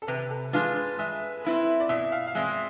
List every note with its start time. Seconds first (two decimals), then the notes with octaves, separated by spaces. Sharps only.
0.02 A4
0.07 C3 B4
0.30 A4
0.53 G#3 D4 F4 B4
0.76 B4
0.99 G#3 E5
1.44 C4 E4 B4
1.80 D5
1.89 B2 E5
2.12 F5
2.27 F5
2.35 G#3 C4 E5